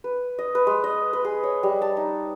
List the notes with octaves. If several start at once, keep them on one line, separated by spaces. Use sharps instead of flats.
B4
D#5
B4
G#3
D#5
B4
G#4
C#5
G3
A5
D#4